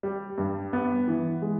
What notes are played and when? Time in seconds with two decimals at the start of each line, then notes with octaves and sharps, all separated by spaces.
0.03 G3
0.38 G2
0.73 B3
1.08 E3
1.42 G#3